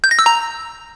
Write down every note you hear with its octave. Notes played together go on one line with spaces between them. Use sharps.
G6
A#6
E6
A#5